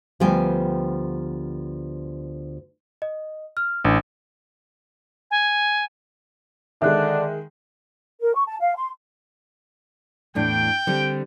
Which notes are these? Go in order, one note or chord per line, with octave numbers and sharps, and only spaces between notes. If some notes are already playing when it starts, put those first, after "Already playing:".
D2 F3 G3 B3 G5 G#5
D#5
F6
A1 D4
G#5
D3 D#3 G#3 D4 E5 F#6
A#4
C#6
A5
F5
C6
E2 A2 D4 G5
D3 G3 C4